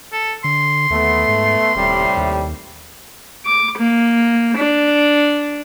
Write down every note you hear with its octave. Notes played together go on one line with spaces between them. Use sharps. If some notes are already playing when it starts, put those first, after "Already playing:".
A4
D3 C6
D#2 A3 B3
G#2
D#1 A2 C3 G3
D#2
D6
A#3
D4